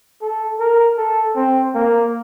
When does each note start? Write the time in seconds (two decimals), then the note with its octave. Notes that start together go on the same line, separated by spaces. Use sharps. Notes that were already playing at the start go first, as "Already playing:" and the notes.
0.22 A4
0.59 A#4
0.98 A4
1.36 C4
1.75 A#3